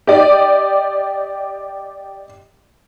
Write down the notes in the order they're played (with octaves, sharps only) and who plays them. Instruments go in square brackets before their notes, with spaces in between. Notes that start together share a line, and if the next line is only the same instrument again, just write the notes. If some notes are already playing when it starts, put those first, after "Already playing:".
[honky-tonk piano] G4 D5 D#5